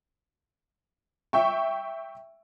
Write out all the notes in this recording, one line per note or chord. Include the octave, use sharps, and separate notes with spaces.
E5 G5 C#6